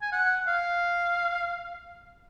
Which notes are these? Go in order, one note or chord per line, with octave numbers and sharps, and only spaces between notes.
G#5
F#5
F5